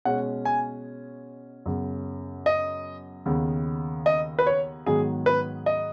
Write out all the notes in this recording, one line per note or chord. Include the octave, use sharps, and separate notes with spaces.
B2 G#3 C#4 F#5
G#5
F#2 C#3 B3
D#5
D#2 C#3 B3
D#5
B4
C#5
G#2 D#3 F#3 B3 G#4
B4
D#5